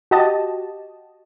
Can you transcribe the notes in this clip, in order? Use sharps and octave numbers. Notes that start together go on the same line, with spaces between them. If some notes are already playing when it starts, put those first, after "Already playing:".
F#4 G4 D#5 A5